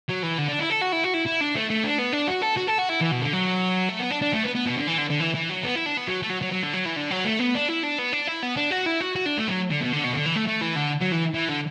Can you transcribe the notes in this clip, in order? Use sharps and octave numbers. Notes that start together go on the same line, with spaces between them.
F#3
E3
D3
D4
E4
A4
F#4
E4
F#4
E4
E4
D4
A3
A3
D4
B3
D4
F#4
A4
F#4
A4
F#4
E4
E3
B2
D3
F#3
A3
B3
D4
D4
A3
B3
B3
B2
D3
E3
D3
D3
E3
E3
F#3
B3
E4
D4
B3
F#3
A3
F#3
F#3
F#3
D3
F#3
E3
D3
F#3
A3
B3
D4
E4
D4
B3
D4
E4
B3
D4
F#4
E4
F#4
F#4
D4
A3
F#3
D3
B2
D3
B2
D3
E3
A3
A3
E3
D3
F#3
E3
E3
D3